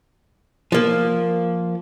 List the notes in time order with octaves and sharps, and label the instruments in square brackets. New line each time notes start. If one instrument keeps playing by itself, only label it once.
[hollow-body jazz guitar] F3 A#3